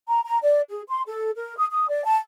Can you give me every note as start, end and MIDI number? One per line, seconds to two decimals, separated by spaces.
0.08 0.21 82
0.24 0.38 82
0.42 0.60 74
0.69 0.81 68
0.87 1.01 84
1.06 1.31 69
1.36 1.56 70
1.57 1.66 87
1.72 1.87 87
1.89 2.02 74
2.04 2.17 81